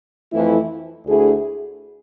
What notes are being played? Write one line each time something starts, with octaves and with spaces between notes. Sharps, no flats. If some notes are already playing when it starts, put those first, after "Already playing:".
F2 E3 A3 E4
D2 D3 A3 E4 G#4